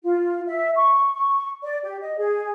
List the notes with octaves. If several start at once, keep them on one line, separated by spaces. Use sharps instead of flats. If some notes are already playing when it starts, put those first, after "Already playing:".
F4
E5
C#6
C#6
D5
G4
D#5
G#4